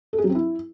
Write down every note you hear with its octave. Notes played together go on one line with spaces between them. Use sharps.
A4
G#4
F#3
C4
E4